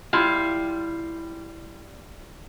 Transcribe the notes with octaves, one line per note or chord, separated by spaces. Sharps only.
G3 E4 F4